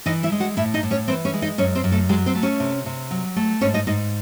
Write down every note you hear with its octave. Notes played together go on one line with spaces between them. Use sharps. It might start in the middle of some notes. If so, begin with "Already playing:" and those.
E3 D#4 D#5
E4 E5
G#3
F#4 F#5
A2 E4 E5
D#4 D#5
A2
C#4 C#5
E3 C4 C5
C#4 C#5
G#3
D#4 D#5
F#2 C#4 C#5
C4 C5
F#2
A3 A4
F#3 G#3 G#4
C4 C5
A3
C#4 C#5
C3
C3
F#3
A3
G#2 C#4 C#5
D#4 D#5
G#2 D#4 D#5